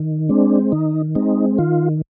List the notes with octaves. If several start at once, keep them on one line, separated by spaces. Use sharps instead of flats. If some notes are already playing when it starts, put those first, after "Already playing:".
Already playing: D#3
G#3 C4 D4
D#3 D#4
G#3 C4 D#4
D#3 F4